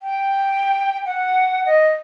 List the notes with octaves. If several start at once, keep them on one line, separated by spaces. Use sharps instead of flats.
G5
F#5
D#5